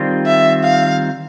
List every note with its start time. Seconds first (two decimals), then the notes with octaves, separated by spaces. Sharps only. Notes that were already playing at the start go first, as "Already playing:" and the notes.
Already playing: D#3 G3 C4 F4
0.26 E5
0.64 F5